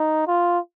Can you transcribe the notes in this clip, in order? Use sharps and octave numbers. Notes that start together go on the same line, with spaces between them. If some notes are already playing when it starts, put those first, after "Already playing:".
Already playing: D#4
F4